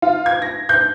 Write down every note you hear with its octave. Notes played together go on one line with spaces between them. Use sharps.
F4
G#6
A#6
G6